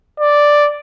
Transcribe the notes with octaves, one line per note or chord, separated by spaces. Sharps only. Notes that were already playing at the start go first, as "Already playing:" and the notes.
D5